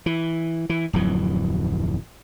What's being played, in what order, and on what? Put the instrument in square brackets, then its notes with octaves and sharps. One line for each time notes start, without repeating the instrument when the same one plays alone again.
[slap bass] E3
E3
D1 F2 E3 F#3